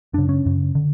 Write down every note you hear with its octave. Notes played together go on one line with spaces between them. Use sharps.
F#2 C#3 D4
C#4
F#2 C#3
D3